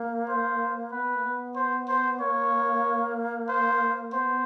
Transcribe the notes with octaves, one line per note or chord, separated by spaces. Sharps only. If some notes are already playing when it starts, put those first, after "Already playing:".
Already playing: A#3
C5
B3 B4
A#3
B3
C5
C5
A#3 C#5
C5
B3 C5